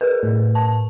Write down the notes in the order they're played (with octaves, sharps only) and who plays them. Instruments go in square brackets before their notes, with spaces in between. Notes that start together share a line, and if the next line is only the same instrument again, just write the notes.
[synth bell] G#4 A#4 B4
[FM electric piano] A2
[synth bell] A5